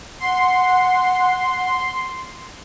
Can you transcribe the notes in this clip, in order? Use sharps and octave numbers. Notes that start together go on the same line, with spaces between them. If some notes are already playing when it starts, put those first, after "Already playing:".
F#5 C6